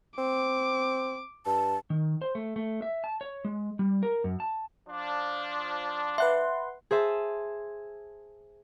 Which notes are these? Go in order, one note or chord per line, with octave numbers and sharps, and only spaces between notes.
C4 D6
G2 A5
D#3
C5
A3
A3
E5
A5
C#5
G#3
G3
A#4
F#2
A5
F3 D4
B4 E5 F#5 C6
G#4 C5 E5 A5